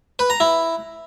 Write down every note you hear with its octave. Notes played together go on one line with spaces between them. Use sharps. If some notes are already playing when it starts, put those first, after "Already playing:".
B4
A#5
E4